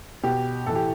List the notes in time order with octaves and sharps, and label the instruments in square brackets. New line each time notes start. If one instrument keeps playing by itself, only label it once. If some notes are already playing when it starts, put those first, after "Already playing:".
[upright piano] B2 G4
A2 E3 A4
G4